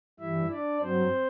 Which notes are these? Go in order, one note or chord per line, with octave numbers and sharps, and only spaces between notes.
G2 E3 G3 E4 E5
D4 D5
G2 F#3 C4 C5